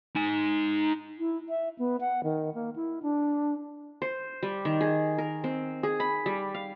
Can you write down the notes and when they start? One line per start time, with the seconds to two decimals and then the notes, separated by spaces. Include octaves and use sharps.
0.16 D#4 G#5
1.19 E4
1.49 E5
1.79 B3
2.01 F#5
2.24 D#3
2.54 A#3
2.76 E4
3.02 D4
4.02 C5
4.43 G3
4.65 D#3
4.81 G#4
5.18 A#4
5.44 C4
5.83 G#4
6.00 B5
6.26 G3
6.54 F5